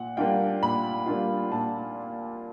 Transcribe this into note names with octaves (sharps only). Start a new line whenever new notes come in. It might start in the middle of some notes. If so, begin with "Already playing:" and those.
Already playing: A#2 F#5
G3 A#3 D4 F4 G5
A#2 B5
G3 A#3 D4 F4
A#2 A5